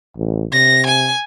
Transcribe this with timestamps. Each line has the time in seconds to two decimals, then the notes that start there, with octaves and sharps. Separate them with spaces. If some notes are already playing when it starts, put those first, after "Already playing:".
0.17 A1
0.53 C3 A#6
0.86 G#5